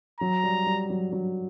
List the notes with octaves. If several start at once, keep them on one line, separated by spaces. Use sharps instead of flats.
F#3 A#5
G3
G3
F#3
F#3